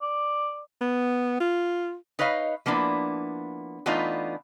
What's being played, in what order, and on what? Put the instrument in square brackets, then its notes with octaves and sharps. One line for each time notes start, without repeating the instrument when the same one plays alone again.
[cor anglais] D5
[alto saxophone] B3
F4
[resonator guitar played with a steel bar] D#4 B4 C#5 D#5 F5
F3 A#3 B3 D4 E4
E3 A3 B3 D4 D#4 F4